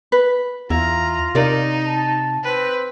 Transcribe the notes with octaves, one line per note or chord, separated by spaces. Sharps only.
B4
E2 E4 F4 A#5
C3 D#4 A#4 D5
A5
C4 B4